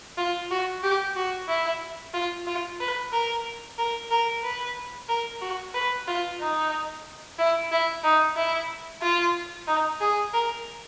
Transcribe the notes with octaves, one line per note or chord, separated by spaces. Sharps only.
F4
F#4
G4
F#4
E4
F4
F4
B4
A#4
A#4
A#4
B4
A#4
F#4
B4
F4
D#4
E4
E4
D#4
E4
F4
D#4
G#4
A#4